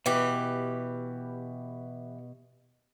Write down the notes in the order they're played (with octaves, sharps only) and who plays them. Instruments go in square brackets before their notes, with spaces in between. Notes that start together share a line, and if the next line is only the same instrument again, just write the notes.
[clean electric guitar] B2 [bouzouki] E3 G4